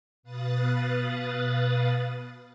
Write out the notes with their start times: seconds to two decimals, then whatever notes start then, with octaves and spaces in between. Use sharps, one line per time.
0.23 B2 B4 F5 D#6 F#6 A6